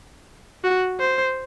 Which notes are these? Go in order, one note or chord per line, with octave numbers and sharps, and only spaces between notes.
F#4
C5